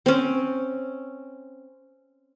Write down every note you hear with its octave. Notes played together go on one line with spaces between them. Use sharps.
C4 C#4